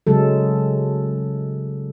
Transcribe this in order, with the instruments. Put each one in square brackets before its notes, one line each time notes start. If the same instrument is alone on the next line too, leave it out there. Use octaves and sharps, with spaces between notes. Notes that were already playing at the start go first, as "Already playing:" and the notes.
[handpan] C#3 F#3 G#3 A4